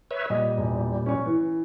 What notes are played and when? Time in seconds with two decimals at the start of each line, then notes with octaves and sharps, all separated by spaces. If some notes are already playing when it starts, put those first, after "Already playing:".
0.11 B4 C#5 E5
0.30 A#2 G3 D#5
0.57 E1
1.06 C#4 C#6
1.26 E3